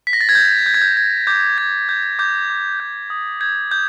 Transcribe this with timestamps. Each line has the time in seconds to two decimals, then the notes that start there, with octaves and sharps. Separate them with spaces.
0.07 B6
0.13 A#6
0.21 A6
0.29 G#6
0.35 G6
0.66 G6
0.74 G#6
0.82 G6
0.96 G6 G#6
1.27 D6 G6
1.57 G6 G#6
1.89 G6
2.19 D6 G6
2.50 D6
2.80 G6
3.10 D#6
3.41 G6 G#6
3.71 G6